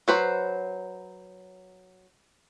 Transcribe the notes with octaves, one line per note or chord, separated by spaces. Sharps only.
F#3 B4 C5